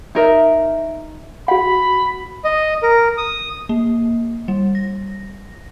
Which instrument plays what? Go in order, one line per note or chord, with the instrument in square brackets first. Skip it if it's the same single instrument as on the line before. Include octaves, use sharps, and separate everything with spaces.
[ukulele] D#4 A#4 E5
[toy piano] F#4 F#5 [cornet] B5
[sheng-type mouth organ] D#5
A#4
D#6
[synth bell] A#3
G3
A#6